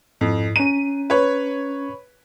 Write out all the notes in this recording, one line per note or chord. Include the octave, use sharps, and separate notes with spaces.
F2 G#2 E4
C#4 A#5 D#7
B4 C#5